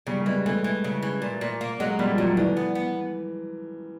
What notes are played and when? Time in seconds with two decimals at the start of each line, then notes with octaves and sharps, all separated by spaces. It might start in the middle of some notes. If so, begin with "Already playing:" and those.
0.07 C#3 G3
0.21 G3
0.26 E3 G#3
0.46 E3 A3
0.64 E3
0.84 C#3
1.03 E3
1.22 A#2
1.41 A#2
1.61 A#3
1.80 F#3 G#3
1.99 A#2 G3
2.14 F3
2.18 A#2 F#3
2.37 D3 E3
2.57 B3
2.75 B3